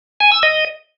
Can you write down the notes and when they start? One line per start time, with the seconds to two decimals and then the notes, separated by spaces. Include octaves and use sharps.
0.20 G#5
0.32 E6
0.43 D#5